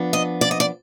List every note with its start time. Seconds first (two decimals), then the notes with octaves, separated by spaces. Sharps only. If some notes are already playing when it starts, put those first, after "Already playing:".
Already playing: F3 B3 D4
0.13 D#5
0.41 D5
0.51 D#5
0.60 D5